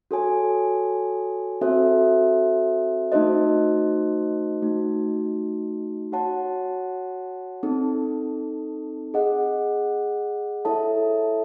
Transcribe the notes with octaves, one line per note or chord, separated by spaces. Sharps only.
F#4 A4 C#5 G#5
C4 F#4 A4 C5 E5
A3 D#4 F#4 C5 D#5
A3 D#4 F#4
F#4 C#5 F#5 A5
C4 D#4 A4
G#4 D#5 F#5
E4 A4 C#5 E5 A5